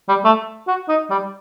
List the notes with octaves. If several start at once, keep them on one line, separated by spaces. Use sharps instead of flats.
G3
A3
F#4
D#4
G3